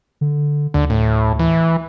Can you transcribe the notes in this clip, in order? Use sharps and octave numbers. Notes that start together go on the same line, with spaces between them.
D3
D2 D3
A2
E3